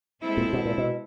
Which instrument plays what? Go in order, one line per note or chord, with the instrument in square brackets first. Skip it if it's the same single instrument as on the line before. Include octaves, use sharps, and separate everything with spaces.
[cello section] G#3 C4 E4 A4
[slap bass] A#2
B2
A#2
B2